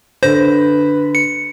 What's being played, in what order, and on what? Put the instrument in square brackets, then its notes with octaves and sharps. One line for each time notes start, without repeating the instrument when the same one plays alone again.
[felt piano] D3 A#6 [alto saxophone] B4 [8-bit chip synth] C5
[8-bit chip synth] C#7